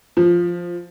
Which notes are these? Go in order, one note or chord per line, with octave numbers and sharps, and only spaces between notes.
F3